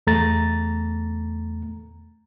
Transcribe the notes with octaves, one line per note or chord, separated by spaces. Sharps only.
E2 A3 A#5 A6